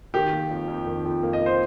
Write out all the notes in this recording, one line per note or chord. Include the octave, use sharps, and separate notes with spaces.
D#3 G4
A#3
F2
F2
D#3
F2
A#3
D#5
A#3
C5